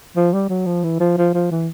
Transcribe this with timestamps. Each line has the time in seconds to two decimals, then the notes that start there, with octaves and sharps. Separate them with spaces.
0.16 F3
0.33 G3
0.50 F#3
0.66 F3
0.83 E3
1.00 F3
1.18 F3
1.34 F3
1.51 E3